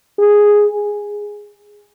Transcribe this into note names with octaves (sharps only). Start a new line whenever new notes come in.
G#4